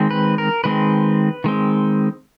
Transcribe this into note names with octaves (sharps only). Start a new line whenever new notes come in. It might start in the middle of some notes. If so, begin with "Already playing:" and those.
Already playing: D#3 G#3 C4
B4
A#4
D#3 G#3 C4 B4
D#3 G#3 C4